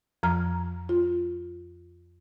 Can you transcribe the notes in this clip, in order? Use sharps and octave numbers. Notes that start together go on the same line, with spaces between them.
F2 F3 A#5 F6
F4